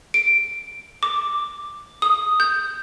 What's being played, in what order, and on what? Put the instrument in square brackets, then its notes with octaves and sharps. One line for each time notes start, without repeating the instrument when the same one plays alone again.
[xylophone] D7
D6
D#6
G6